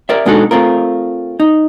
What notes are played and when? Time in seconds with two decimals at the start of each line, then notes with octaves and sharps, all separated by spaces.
0.09 A#4 D5 E5
0.26 B2 G#3 D4 D#4 F#4 A4
0.51 A3 C4 F4 A#4
1.40 D#4